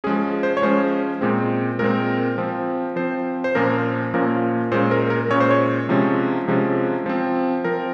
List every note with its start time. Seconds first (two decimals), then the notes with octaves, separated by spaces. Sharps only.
0.04 C#4 G#4
0.07 F3 G#3
0.43 C5
0.57 C#5
0.62 F3 G#3 C#4 C5
1.21 A#2 G#3 C4
1.79 A#2 G#3 C4 A#4
2.38 F3 C4
2.96 F3 C4 C5
3.44 C5
3.55 A#2 F3 A#3 C#4 A#4
4.14 A#2 F3 A#3 C#4 A#4
4.72 A#2 G#3 C#4 C5
4.91 A#4
5.10 A#4
5.30 A#2 G#3 C#4 C#5
5.40 C5
5.51 C#5
5.89 C3 F3 G#3 C#4
6.48 C3 F3 G#3 C#4
7.06 F3 C4
7.64 F3 C4 A#4